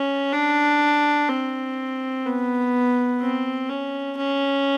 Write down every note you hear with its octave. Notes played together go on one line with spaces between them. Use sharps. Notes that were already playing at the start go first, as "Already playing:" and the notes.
Already playing: C#4
D4
C4
B3
C4
C#4
C#4